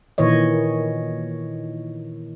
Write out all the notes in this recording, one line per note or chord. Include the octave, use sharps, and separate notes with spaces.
A#2 D#3 E3 C#5 D#5